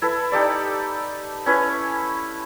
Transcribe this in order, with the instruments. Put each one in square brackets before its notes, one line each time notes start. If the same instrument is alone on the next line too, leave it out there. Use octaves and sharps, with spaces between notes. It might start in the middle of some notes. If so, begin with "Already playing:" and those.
[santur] E4 A4 B4
D#4 G4 A4 D5
C#4 E4 B4 C#5